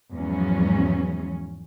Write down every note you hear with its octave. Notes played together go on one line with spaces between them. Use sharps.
E2 G#2 F3 F#3 C#4